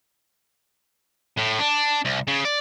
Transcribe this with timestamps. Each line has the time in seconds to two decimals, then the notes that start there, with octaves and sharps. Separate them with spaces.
1.37 A2
1.58 D4
2.05 C2
2.27 C#3
2.45 D5